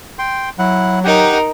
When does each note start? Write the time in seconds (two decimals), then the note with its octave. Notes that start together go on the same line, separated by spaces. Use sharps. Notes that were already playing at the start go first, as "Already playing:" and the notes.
0.19 G5 C6
0.59 F#3 E4 F#5
1.04 D#4 G4 A#4 F#5